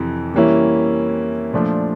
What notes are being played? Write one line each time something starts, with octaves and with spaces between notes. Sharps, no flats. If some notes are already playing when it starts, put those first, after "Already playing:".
Already playing: F2 C3 E3
E3 G3 A#3 C#4 E4
A#2 F3 A3 D4